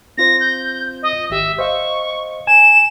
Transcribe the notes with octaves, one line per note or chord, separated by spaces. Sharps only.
C4 F4 C5 A#6
G6
D#5
G#1 G4 E5
C5 D#5 F5 C#6
G#5 E7